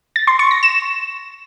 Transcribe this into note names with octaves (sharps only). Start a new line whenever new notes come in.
A6
C6
C#6
A#6
E7